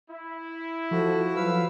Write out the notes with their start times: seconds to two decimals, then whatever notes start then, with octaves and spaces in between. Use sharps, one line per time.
0.10 E4
0.91 F3 F#4 A4
1.36 F#3 B4 F5 E6